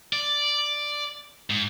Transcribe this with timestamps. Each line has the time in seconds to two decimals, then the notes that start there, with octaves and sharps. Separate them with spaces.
0.13 D5
1.50 G#2